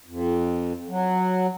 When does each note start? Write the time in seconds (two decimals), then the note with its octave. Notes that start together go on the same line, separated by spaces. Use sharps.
0.06 F2
0.89 F#3